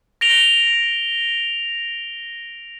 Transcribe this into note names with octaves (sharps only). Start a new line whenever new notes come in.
A#6 D7 F7 G7